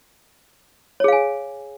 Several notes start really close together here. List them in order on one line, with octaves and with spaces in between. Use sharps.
C#5 G#4 F5 G#5